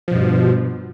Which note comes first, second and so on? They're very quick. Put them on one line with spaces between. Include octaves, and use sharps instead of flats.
F3 B2 G2